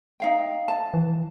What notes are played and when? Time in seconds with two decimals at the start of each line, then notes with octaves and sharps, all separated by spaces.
0.20 D#4 F5 G5
0.68 A5
0.94 E3